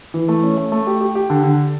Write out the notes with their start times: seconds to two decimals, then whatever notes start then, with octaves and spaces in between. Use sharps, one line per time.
0.14 E3
0.28 A3
0.43 C#4
0.57 A3
0.72 A3
0.87 G4
1.01 G4
1.15 G4
1.30 D3
1.43 D3